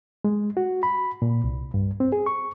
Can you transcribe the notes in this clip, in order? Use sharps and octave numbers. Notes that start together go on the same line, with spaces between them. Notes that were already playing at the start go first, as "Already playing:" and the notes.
G#3
F#4
B5
A#2
C2
G2
C4
G#4
C#6